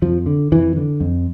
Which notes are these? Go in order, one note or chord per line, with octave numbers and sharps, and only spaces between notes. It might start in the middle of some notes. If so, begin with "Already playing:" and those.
F2 F3
D3
F2 E3
D3
F2